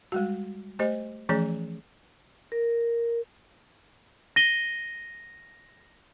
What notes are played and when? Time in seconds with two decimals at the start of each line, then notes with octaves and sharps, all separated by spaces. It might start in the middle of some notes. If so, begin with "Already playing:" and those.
0.12 G3 G#3 F#4
0.79 A3 G4 C5 D#5
1.29 E3 F3 A3 C#4 G#4 C#5
2.52 A#4
4.36 A#6 D#7 G7